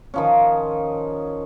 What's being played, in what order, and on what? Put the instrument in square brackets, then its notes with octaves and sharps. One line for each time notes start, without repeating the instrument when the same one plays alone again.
[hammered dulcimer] D#3 F3 C#4